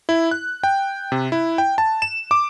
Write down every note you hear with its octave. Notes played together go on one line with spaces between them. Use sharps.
E4
F#6
G5
C3
E4
G5
A5
E7
D6